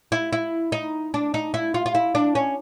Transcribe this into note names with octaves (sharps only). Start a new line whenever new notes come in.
E4
E4
D#4
D4
D#4
E4
F4
F4
E4
D4
C#4